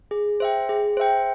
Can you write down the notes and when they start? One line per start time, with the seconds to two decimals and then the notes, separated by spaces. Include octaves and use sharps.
0.11 G#4
0.40 C5 E5 G5
0.69 G#4
0.97 C5 E5 G5